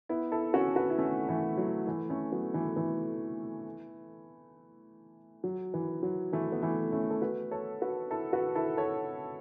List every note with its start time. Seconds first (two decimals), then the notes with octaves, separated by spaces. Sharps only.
0.09 B3 E4
0.32 E4 A4
0.54 C#4 F#4
0.76 F#4 B4
0.90 E4
0.98 A3 C#4
1.28 E3 A3
1.57 F#3
1.87 E3 A3
2.10 A3 C#4
2.32 F#3 B3
2.54 E3 A3
2.76 E3 A3
5.44 F#3
5.74 E3
6.03 F#3
6.33 E3 A3
6.52 B3
6.62 E3 A3
6.92 A3 C#4
7.10 A4
7.22 F#4 B4
7.51 A4 C#5
7.81 F#4 B4
8.11 E4 A4
8.33 F#4 B4
8.55 E4 A4
8.77 A4 C#5